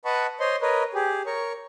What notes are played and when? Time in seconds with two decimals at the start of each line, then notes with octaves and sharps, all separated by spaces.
0.05 B4 D#5 F#5 A5 B5 C#6
0.40 C5 C#5 D#5 C6
0.62 A#4 B4 C#5 D#5
0.94 G4 G#4
1.26 A#4 C#5 C#6